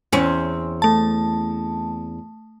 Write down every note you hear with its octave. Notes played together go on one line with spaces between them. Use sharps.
E2 C4 C#4
A3 A5